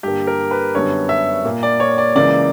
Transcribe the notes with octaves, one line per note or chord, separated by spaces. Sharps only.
G2 D3 A#3 G4
A#4
B4
F#2 D3 G3 B3 C#5
E5
A#2 A#3
D5
C#5
D5
C#2 C#3 E3 A#3 D5